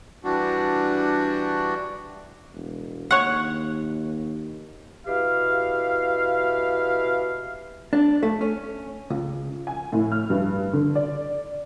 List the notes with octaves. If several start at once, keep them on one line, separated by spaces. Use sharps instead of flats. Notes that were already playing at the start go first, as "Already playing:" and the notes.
E3 G3 D4 F#4
E1
D#2 C#5 F#5
B2 E4 G4 F5
D4
A3
C#4
C#2
G#5
A2
F6
G2
D3
D5